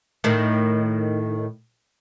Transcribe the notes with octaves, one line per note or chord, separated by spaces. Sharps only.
A2 D#3